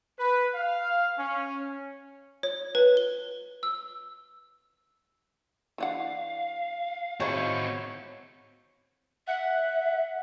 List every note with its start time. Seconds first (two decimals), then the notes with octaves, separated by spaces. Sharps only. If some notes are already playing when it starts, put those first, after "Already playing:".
0.19 B4
0.54 F5
1.18 C#4
2.43 C#5
2.75 B4
2.97 G7
3.63 E6
5.78 E3 D4 F5 F#5
7.20 G#3 C4 D#4 E4 F#4 C#5
9.27 E5 F#5